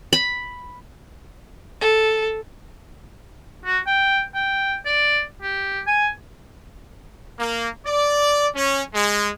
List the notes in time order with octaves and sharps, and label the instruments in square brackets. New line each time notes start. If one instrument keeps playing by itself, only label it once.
[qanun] B5
[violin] A4
[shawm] F#4
G5
G5
D5
G4
G#5
[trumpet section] A#3
D5
C#4
G#3